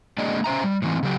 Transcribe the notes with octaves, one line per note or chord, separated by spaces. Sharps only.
G#3 A#3 D4 G#4 D5 D#5
C#4 C5 E5 A#5
G3
A2 E3 C4
C#3 F#3 G4